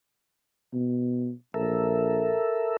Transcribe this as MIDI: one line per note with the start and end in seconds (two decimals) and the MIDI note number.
0.73 1.31 47
1.54 2.36 34
1.54 2.77 69
1.54 2.77 70
1.54 2.77 76